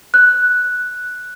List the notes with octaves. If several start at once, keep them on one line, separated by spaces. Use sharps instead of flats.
F#6